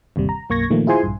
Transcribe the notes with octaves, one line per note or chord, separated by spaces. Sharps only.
G1 D#2 C3 G3
A#5
B1 F#2 A#3 C#6 G#6 A#6
A#2 D#3 F3 A3 A#3
E4 F4 G#4 C5 G#5 C6
A#1 G2